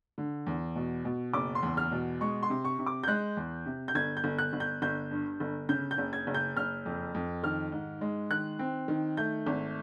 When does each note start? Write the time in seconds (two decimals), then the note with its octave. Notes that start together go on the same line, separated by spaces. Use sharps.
0.18 D3
0.47 E2
0.76 B2
1.05 B2
1.33 F#1 D6
1.55 C6
1.63 E2
1.77 F6
1.92 B2
2.21 G#3 C#6
2.43 C6
2.50 C3
2.65 C#6
2.79 C3
2.86 D6
3.03 G6
3.08 G#3 F#6
3.37 E2
3.66 C3
3.88 G6
3.95 G1 G#6
4.17 G6
4.24 G1
4.38 F#6
4.53 G1
4.60 G6
4.82 G1 G6
5.11 G2
5.40 G1
5.69 C#3 G6
5.91 G6
5.98 F#1
6.13 G#6
6.27 F#1
6.34 G6
6.57 F#1 F6
6.86 F2
7.15 F2
7.43 D#3 F6
7.72 G#2
8.01 G#3
8.30 D#3 F#6
8.59 C4
8.88 D#3
9.17 A3 G6
9.46 G#1